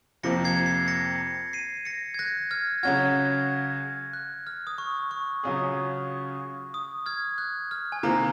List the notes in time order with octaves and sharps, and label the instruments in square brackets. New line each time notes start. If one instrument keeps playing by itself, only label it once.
[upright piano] F2 C3 F3 A#3 [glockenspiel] A#6 C#7
[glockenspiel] G#6 C7
G#6 C7
A#6 C#7
C7 D#7
A#6 C#7
G#6
F#6 A#6
F6 G#6
[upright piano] C#3 F#3 C#4 F#4 [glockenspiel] F6 G#6
[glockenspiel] F#6
F6
D#6
C#6
C#6
[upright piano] C#3 F#3 C#4 F4 G#4
[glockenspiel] D#6
F6 G#6
F#6
F6
G#5
[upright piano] C3 D#3 A#3 [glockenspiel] A#5